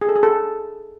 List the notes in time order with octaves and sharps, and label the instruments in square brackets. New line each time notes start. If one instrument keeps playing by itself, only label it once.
[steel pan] G#4
A4
G#4
A4